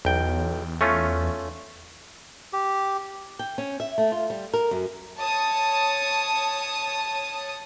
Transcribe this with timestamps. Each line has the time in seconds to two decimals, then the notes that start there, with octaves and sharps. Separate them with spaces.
0.05 B1 E2 G5
0.81 A3 C#4 F4
2.53 G4
3.39 G5
3.58 C#4
3.80 E5
3.98 A3
4.12 F4
4.30 G3
4.53 A#4
4.71 F#2
5.18 C#5 A5 D#6